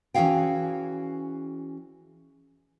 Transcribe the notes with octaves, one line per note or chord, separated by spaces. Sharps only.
E3 C#4 F#4 G#4 F5 G5